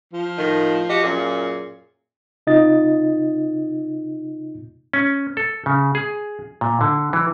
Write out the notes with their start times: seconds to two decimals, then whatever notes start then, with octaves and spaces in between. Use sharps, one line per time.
0.13 F3
0.38 A2 D#3
0.89 F#4 G4 D#5
1.03 F#2 A#2 G#4
2.47 C3 D#4 F4 D#5 A6
4.93 C#4
5.37 A4
5.66 C#3
5.95 G#4
6.61 A#2
6.81 D3
7.13 E3